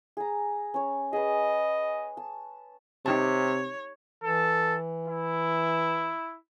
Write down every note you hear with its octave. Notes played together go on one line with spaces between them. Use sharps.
G#4 A#5
C#4 C#5
G#4 B4 D#5
A5
C3 D#4 G4 C#5 A5
E3 A4
E4